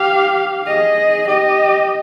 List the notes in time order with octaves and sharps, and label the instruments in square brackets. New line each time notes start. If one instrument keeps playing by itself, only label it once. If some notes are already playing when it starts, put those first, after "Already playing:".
Already playing: [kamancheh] G4 [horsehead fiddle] F5
[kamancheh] G#4 [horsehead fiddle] D#5
[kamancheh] G4 [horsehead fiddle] D#5